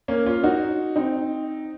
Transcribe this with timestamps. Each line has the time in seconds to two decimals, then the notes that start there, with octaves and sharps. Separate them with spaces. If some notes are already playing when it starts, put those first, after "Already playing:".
0.08 A#3 C#4
0.26 C#4 F4
0.43 D#4 F#4
0.96 C4 D#4